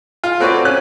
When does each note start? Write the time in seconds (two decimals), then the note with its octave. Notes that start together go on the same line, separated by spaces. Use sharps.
0.24 F4
0.40 A3 C4 F#4 B4 C#5 D5
0.65 C#4 F#6